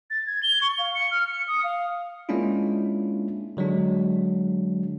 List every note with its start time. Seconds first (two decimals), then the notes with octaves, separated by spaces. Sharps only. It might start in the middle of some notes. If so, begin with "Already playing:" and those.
0.10 A6
0.27 G#6
0.43 G7
0.62 C#6
0.78 F5
0.95 C#7
1.11 F6
1.31 C#7
1.48 D#6
1.64 F5
2.29 G#3 A#3 C#4 D4 E4 F4
3.57 D3 F#3 G#3 D4